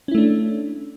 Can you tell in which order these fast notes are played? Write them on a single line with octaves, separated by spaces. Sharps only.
C#4 E4 A3 D4